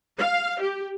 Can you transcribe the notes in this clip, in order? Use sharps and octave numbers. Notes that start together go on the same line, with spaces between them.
F5
G4